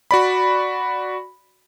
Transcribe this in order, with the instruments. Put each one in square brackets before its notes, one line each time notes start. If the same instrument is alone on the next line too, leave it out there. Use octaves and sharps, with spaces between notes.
[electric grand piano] F#4 D5 B5